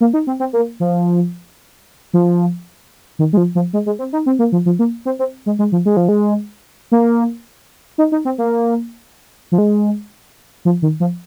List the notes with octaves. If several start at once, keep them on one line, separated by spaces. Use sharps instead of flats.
A#3
D#4
C4
C4
A#3
F3
F3
D#3
G#3
F3
F3
G#3
G#3
C4
D#4
C4
A#3
F3
F3
A#3
C4
C4
G#3
G#3
F3
G#3
F3
G#3
A#3
D#4
D#4
C4
A#3
F3
G#3
F3
D#3
F3